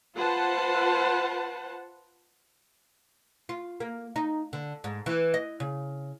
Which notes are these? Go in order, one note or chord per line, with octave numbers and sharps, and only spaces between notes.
F4 B4 C5 F#5 A5
F4
A#3
D#4
D3
G#2
E3
D#5
C#3